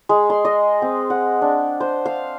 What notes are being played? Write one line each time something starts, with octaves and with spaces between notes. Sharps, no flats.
G#3
C6
D#5
C4
F#5
D4
C5
F5